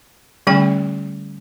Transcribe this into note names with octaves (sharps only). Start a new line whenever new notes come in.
D3 G3 A3 C#4 G5 B5